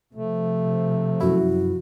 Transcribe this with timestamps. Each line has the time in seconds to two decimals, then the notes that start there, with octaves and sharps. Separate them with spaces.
0.14 C3 F3 A3
1.21 F#2 E4 F#4